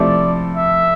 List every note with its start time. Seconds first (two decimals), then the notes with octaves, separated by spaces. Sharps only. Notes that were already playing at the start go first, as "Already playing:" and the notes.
Already playing: C3 F3 A3 E4 A4 D5
0.57 E5